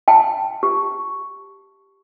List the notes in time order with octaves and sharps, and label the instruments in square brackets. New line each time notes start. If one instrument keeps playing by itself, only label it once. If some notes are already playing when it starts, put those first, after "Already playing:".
[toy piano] G5 A5
G4